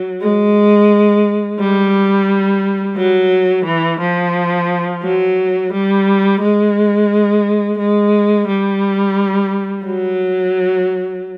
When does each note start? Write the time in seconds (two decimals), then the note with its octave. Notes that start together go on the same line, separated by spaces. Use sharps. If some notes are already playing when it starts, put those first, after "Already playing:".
Already playing: F#3
0.21 G#3
1.59 G3
2.97 F#3
3.66 E3
4.01 F3
5.03 F#3
5.73 G3
6.41 G#3
7.79 G#3
8.48 G3
9.85 F#3